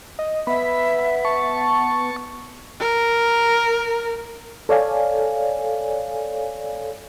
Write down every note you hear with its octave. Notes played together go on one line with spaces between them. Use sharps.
D#5
B3 E5 B5
A5 C#6
A#4
A4 C#5 D5 F5 G#5